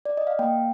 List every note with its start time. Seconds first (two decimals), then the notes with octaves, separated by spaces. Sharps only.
0.05 D5
0.17 D#5
0.27 F5
0.39 A#3 G5